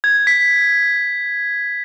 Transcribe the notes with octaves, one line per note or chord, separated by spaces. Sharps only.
G#6
B6